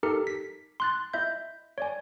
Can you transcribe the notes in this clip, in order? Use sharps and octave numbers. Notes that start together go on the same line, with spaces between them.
D#4 G4 A4 A#4 F6 C#7
B6
C6 F#6 A6
E4 D#5 E5 G6
C#5 D5 G#5